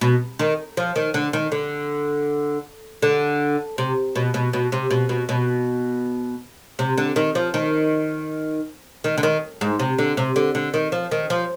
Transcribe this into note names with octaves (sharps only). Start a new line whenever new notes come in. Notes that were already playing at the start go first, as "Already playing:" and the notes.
B2
D#3
F3
D#3
D3
D#3
D3
D3
C3
B2
B2
B2
C3
B2
B2
B2
C3
D3
D#3
F3
D#3
D#3
D3
D#3
G#2
C3
D3
C3
D3
D3
D#3
F3
D#3
F3